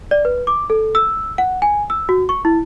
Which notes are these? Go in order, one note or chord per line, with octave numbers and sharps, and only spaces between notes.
D5
B4
D6
A4
E6
F#5
G#5
E6
F#4
C#6
E4